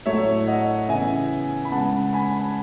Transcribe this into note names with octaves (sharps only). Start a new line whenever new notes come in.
A2 F#3 A3 C#5 E5
D#5 F#5
C#3 E3 B3 E5 G#5
B5
C#3 G#3 B3 F#5 A5
G#5 B5